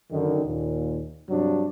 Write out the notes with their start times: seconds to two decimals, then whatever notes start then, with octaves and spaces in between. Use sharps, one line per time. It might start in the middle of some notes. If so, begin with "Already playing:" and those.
0.12 F#2 D3 D#3
0.46 D#2 A#2
1.30 G2 C3 F#3 D4